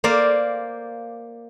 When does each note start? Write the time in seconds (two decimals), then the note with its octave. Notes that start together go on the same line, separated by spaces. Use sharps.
0.04 A#3 C5 D5 F5